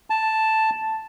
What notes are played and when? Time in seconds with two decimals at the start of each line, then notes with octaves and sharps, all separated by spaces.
0.10 A5